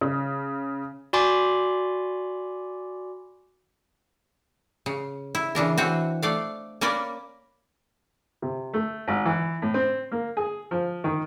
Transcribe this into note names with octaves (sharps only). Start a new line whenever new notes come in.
C#3
F#4 D5 G#5 B5 C6 D6
C#3
E4
C#3 E3 D4 A#4
E3 C4 F#4
A3 D5 F5
A#3 C#4 A#4 B4 D5
C3
A3
G#1
E3
A2
C4
A#3
G#4
F3
D#3